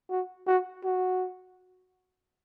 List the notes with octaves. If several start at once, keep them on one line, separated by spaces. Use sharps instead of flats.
F#4
F#4
F#4